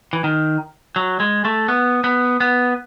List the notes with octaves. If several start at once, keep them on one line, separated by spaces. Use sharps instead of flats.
E3
D#3
F#3
G#3
A3
B3
B3
B3